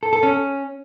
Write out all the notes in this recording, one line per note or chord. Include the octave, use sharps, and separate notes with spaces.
A4
A4
C#4